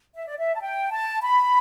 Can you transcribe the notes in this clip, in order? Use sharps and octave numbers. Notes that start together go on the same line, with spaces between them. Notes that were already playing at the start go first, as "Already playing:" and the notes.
E5
D5
E5
A5
G5
A5
B5